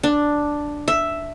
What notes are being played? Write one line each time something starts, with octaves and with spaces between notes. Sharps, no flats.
D4
E5